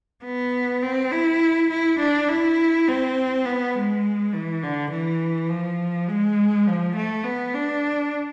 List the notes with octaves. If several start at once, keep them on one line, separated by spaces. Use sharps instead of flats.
B3
C4
E4
E4
D4
E4
C4
B3
G#3
E3
D3
E3
F3
G#3
F3
A3
B3
D4